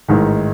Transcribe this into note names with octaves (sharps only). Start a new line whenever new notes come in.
A1 G#2 D#3